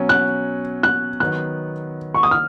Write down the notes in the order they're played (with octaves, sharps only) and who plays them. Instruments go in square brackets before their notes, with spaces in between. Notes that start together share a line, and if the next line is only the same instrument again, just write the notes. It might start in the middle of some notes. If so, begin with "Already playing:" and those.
Already playing: [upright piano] B2 F#3 C#4
[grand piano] F#6
F#6
[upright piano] D#3 F#3 B3 [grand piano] F#6
[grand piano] C#6
D#6
F6